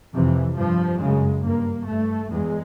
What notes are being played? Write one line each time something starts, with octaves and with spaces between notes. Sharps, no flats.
F2 C3 E3
G2 F3
F#2 C#3 G#3
G2 A#3
G2 A3
E2 G#3